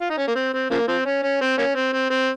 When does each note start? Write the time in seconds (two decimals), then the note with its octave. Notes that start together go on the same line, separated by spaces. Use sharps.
0.01 F4
0.10 D#4
0.18 C#4
0.27 A#3
0.35 C4
0.54 C4
0.70 C#3 F3 A#3
0.88 F3 C4
1.06 C#4
1.23 C#4
1.41 C4
1.58 A#3 C#4
1.75 C4
1.93 C4
2.10 C4